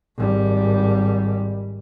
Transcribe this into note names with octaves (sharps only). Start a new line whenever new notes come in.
G#1 G3